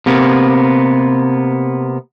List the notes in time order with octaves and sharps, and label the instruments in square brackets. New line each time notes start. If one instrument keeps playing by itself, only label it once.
[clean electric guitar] C3 A#3 B3